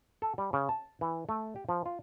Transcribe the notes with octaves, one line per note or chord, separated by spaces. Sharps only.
A4
G3
C#3
A5
E3
A3
G4
F3
F4